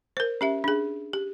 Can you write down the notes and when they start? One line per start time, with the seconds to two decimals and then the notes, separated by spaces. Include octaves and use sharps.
0.17 A#4 C5
0.41 C#4 G4 E5
0.64 D4 G#4
1.13 G4